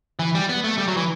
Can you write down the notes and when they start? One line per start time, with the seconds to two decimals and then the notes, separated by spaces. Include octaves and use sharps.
0.19 E3
0.35 G3
0.49 B3
0.64 A3
0.78 G3
0.88 F#3
0.97 E3